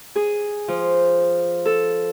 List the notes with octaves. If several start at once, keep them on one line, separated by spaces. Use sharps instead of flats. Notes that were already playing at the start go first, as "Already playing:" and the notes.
G#4
F3
A4